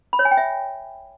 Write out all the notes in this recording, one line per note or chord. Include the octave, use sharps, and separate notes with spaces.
B5
C#5
G#5
G5
E5